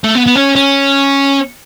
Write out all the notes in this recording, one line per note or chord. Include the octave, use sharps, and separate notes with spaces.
A3
B3
B3
C#4
C#4